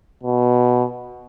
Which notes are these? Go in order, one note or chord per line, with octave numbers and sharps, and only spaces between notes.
B2